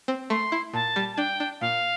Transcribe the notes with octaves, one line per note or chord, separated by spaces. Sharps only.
C4
A3 C6
E4
A#2 A5
G3
A5
D4 G5
D4
A#2 F5